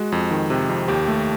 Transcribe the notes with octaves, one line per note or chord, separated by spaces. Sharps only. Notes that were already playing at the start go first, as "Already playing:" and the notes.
Already playing: G#3 F#4
F2
D#3
C3
F2
D#2 G4
A3